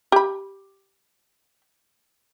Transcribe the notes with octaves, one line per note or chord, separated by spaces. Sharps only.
G4 B5